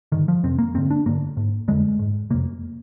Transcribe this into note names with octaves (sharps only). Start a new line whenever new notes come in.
G2 D3 D#3
F3
F2 C3 C4
A#3
G2 D3 C4
D4
G2 D3 A#3
G#2
F2 D3 G#3
G#2
F2 C3 A#3